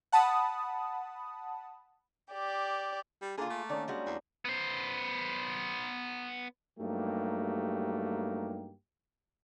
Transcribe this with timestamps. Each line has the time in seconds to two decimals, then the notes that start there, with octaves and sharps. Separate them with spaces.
0.12 F#5 A5 B5 D#6
2.31 G4 D5
3.22 G3
3.38 D3 A#3 F4 G#4
3.50 A3
3.69 D#3 A#3 C#4 D4
3.88 G3 G#3 F#4
4.06 E2
4.45 B3 C5
6.79 G2 F#3 A3 A#3 D#4 G4